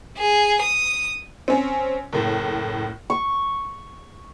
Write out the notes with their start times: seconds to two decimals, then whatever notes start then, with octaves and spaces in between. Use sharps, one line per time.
0.18 G#4
0.62 D#6
1.48 C4 C#4
2.13 F#1 A2
3.10 C#6